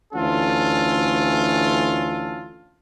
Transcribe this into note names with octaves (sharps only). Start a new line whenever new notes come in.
D2 E3 C#4 F4 A4